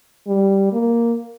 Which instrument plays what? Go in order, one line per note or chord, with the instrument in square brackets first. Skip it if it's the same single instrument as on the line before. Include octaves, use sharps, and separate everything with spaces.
[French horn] G3
A#3